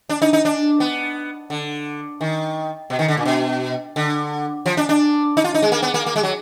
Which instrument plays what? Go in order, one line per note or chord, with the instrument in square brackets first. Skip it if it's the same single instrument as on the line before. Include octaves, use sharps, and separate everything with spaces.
[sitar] D4
D#4
D#4
D4
B3
D3
D#3
B2
D#3
D3
A#2
B2
D3
F3
D4
D4
D#4
F4
D#4
G#3
A#3
B3
A#3
A#3
G#3
F#3